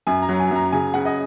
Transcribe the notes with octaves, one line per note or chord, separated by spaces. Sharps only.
F#2 G#5
A#5
F#3
G#5
F#2 A#5
C#3 G#5
C#3 F#5
D#5